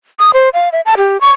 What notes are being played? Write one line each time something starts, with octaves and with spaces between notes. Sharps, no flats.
D#6
C5
F5
E5
A5
G4
C#6